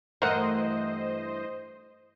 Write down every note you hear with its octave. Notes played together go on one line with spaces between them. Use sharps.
G2 E3 A3 A#4 C5 D#5 F#5